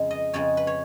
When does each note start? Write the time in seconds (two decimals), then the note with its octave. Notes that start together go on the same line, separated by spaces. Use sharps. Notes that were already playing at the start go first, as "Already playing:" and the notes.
Already playing: F2 C#3 G#3
0.11 D#5
0.34 F2 C#3 G#3 C#5
0.57 B4
0.67 C#5